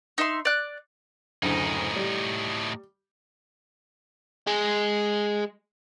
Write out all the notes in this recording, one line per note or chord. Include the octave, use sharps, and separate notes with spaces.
D#4 E5 C6
D5 F#6
F#1 D2 A2 D#4
G3
G#3 G#4